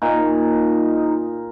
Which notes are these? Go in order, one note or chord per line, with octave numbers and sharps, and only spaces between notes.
A#2 D#4